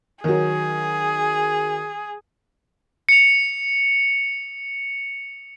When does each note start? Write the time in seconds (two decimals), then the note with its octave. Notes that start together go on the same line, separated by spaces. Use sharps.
0.24 D#3 F#3 G#4
3.09 C#7 F7